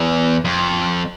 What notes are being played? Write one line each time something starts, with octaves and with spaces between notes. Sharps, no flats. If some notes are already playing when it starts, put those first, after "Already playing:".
Already playing: E2
F2